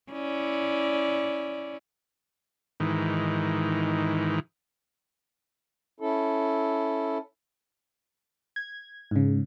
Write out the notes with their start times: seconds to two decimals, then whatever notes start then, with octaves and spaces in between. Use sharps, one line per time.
0.12 C#4 E4 D5
2.80 G#2 D#3 E3
6.00 C#4 E4 A4
8.56 G#6
9.11 G#2 C#3